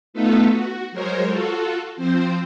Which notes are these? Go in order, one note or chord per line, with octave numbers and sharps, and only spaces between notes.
A3 B3 D#4 F4 A4 B4
F#4
F#3 G#3 A#4 C5 C#5
F4 F#4 A4
F3 C4 C5